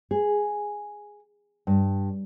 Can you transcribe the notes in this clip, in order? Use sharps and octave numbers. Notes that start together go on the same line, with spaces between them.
G#4
G2